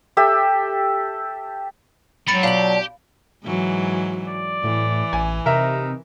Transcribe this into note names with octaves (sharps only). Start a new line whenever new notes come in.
G4 A4 E5
G#2 F#3 G3 B5 A6 C#7
B2 D4 F4 G4 F5 F#7
G#2 E3 F#3
D5
A2 E3
A1 G#5
C3 D#4 A#4 E5